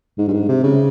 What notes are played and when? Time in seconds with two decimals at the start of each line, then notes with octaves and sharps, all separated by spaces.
0.18 G#2
0.28 G2
0.33 G#2
0.48 C3
0.63 C#3